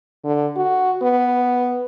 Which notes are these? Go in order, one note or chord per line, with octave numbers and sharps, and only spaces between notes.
D3
F#4
B3